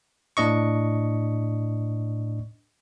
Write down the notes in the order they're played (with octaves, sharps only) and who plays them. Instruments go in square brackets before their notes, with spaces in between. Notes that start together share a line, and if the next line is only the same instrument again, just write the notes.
[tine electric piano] A2 D4 D#5 C#6